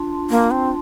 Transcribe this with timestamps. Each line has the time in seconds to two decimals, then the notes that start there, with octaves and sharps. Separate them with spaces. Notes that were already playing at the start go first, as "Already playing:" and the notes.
Already playing: D4 F4
0.30 A#3
0.51 C4